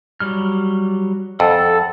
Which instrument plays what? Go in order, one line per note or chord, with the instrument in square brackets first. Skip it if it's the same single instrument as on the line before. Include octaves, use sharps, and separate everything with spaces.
[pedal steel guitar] F#3 G3 F6
[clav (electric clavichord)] F2 [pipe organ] A4 [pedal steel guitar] F#5